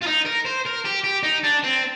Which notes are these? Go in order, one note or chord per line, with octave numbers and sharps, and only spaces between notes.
F4
D#4
A#4
C5
A#4
G4
G4
D#4
D4
C4